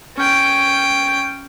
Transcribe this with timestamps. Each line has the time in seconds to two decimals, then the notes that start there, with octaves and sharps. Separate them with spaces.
0.17 C#4 G5